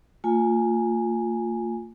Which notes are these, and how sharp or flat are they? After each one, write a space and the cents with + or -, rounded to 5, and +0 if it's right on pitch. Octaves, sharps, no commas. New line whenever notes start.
A#3 -45 F4 +15 G#5 +0